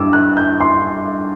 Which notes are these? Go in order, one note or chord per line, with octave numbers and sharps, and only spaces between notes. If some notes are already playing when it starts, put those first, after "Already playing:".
Already playing: G2 D6 E6
F#6
G6
C6